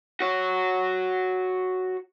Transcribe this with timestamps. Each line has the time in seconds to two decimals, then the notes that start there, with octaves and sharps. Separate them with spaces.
0.20 F#4 C#5